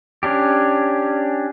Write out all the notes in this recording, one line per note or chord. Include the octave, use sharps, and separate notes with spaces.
C#4 D4 G4